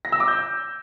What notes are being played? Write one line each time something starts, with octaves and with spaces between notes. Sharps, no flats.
A#6
E6
D6
G6